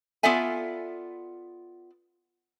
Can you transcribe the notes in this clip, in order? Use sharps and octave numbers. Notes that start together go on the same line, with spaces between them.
B3 F4 A4 D5 E5 G#5